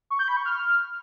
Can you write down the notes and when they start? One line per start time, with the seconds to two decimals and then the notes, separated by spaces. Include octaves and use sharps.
0.10 C#6
0.19 G6
0.28 B5
0.37 C#6
0.46 F6